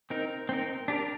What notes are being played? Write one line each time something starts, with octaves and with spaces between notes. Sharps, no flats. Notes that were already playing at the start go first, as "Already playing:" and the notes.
C4 D#4 A#4
C4 D#4 A#4
D4 G4 A#4